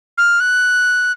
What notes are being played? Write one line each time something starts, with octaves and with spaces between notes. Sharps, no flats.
F6
F#6